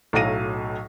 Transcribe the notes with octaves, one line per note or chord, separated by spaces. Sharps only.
B1 A2 F#3 F5 A#6 D#7